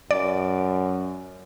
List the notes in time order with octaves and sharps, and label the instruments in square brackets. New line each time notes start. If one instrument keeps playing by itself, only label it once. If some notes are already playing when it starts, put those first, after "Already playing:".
[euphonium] F#2 [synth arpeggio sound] D5